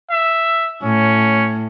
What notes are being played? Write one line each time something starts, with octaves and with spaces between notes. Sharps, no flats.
E5
A2 C#4